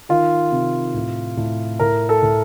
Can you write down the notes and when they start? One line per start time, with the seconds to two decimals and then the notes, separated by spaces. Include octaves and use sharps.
0.09 D#3 F4
0.51 C3
0.94 A2
1.37 A2
1.79 A2 A#4
2.09 A4
2.23 A2